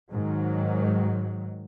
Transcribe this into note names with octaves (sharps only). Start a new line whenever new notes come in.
G#2 D#3 F#3